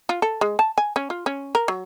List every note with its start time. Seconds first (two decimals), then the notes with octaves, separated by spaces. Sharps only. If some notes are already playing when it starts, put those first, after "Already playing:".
0.09 F4
0.22 A4
0.41 G#3
0.59 A5
0.78 G#5
0.96 C#4
1.10 F4
1.26 C#4
1.55 A#4
1.68 F#3